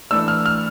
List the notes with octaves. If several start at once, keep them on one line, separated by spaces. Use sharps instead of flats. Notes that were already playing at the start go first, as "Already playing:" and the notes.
E3 A3 D4 E6
F6
F6